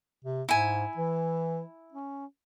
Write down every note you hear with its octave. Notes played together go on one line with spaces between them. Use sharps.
C3
G#2 E4 G#5
E3
C#4